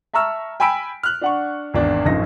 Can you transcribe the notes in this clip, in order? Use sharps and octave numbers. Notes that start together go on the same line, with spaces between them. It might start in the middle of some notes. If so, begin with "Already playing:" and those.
E5 A5 A#5 C#6 E6 F6
G5 G#5 B5 E6 B6 D7
F6 F#6
D4 F#5 C#6
G#1 E2 D4
D#1 G#1 F#2 F3 D#4 A#6